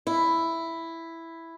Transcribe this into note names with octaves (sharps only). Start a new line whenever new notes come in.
E4